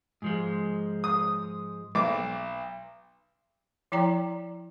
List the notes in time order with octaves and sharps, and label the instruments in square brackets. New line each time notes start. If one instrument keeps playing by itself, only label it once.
[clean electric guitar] G#2 F3 G#3
[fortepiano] D#6
B1 D6
[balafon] F3 E4 D5 G5 A#5